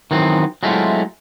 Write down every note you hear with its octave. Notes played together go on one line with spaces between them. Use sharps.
D#3 E3 F#3 B3 C4
F#3 G#3 A3 C4 E4 F4